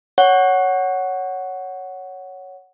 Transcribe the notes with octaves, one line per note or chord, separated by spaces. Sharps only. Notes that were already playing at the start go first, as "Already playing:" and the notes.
C#5 F#5